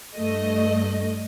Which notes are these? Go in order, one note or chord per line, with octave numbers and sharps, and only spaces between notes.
G2 A3 D#5